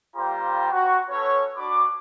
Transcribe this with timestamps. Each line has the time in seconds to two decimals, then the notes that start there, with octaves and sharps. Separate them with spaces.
0.16 G3 A#3 F4 G4 C5 A#5
0.72 F#4
1.10 C#4 A4 B4 C#5
1.57 D4 F#4 B5 D6